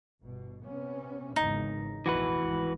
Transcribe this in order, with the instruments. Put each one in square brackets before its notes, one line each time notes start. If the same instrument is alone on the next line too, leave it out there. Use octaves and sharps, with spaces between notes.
[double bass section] G1 B2
C3 B3 C#4
[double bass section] G#1 E2 C#3 [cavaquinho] D#4
[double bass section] F1 A#1 E2 [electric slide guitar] E3 F#4 B4
[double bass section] G#1